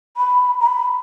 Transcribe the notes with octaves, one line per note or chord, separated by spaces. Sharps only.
B5
A#5
B5